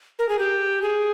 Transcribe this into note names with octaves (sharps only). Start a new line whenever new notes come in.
A#4
G#4
G4
G#4